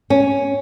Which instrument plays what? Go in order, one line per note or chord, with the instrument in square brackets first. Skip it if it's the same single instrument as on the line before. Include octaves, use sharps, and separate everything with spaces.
[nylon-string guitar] C#4